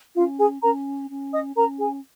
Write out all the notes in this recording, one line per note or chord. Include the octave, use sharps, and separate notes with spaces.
C#4 F4 F5
G#4 G#5
C#4 A#4 A#5
C#4
D#5 D#6
C#4 A#4 A#5
G#4 G#5